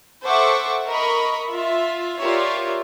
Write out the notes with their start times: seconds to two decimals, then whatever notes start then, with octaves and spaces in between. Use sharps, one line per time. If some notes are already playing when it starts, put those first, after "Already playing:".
0.24 A4 C5 E5 F#5 C#6 D6
0.88 A#4 D#5 B5 C#6
1.49 F4 E5
2.18 F4 G4 A#4 C#5 D5 E5